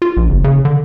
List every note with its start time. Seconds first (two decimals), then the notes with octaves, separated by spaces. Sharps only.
0.02 F4
0.17 A#1
0.29 F#1
0.44 C#3
0.65 D3